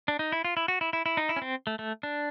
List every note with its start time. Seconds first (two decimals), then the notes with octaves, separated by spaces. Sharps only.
0.08 D4
0.19 D#4
0.32 E4
0.45 F4
0.57 E4
0.68 F#4
0.81 E4
0.93 E4
1.06 E4
1.17 D#4
1.29 E4
1.36 C#4
1.42 C4
1.67 A3
1.79 A3
2.03 D4